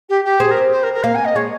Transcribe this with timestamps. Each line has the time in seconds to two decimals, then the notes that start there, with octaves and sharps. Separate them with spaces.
0.09 G4
0.24 G4
0.40 C4 G#4
0.50 A#4
0.71 C5
0.83 A#4
0.93 A#4
1.03 A#3 F5
1.15 G#5
1.25 D#5
1.35 G#3 C#5